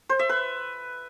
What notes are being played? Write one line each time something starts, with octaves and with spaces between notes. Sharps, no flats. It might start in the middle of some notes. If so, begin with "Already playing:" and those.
C5
E5
B4